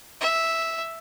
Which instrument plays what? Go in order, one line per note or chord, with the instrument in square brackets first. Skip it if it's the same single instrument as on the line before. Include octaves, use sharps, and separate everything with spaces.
[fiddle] E5